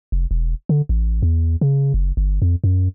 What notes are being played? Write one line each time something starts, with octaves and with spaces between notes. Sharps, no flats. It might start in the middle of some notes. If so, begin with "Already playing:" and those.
F1
E1
D3
A1
E2
C#3
F#1
G1
F2
F#2